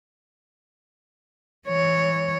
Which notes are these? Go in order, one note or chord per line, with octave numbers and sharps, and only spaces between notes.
E3 C#5